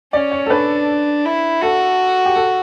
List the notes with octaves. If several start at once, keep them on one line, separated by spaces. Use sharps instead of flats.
C#4 D5
C#5
A4
D4 B4
E4
F#4 A4
G4
A4